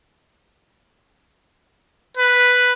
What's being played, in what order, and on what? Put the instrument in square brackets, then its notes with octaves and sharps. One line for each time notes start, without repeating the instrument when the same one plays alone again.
[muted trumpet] B4